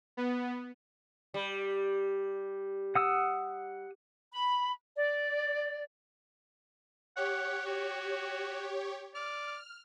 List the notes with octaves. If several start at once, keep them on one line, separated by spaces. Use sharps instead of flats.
B3
G3
F#5 D#6 E6
B5
D5
G4 C#5 F#5
F#4
D5 F6